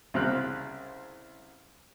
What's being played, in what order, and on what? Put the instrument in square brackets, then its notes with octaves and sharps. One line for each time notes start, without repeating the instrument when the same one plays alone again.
[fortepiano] C2 C#3 C4 F6 F#6